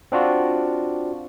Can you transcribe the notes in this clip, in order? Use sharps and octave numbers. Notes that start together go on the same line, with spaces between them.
C4 D4 F4 F#4